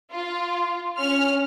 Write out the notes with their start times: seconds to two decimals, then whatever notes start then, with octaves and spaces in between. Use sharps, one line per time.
0.11 F4
0.97 C#4 F6